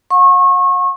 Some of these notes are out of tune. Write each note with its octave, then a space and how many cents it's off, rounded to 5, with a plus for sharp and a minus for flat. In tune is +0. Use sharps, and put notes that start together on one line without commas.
F#5 -40 C#6 -30